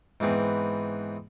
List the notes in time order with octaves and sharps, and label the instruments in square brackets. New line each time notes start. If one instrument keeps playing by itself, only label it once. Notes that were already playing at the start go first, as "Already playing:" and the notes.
[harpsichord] G#2 E3 B3 C4